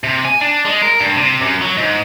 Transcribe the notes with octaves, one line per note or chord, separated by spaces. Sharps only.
C3
G#5
D4
G#3
A#4
G2
C3
F#2
F#3
G#2